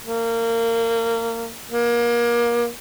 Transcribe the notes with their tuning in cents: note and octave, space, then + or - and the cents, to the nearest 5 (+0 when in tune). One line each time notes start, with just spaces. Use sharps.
A#3 -25
A#3 +30